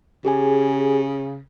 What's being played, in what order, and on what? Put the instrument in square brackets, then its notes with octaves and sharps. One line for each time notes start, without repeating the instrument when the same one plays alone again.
[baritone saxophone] C#3 [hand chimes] G4 G#4 G#5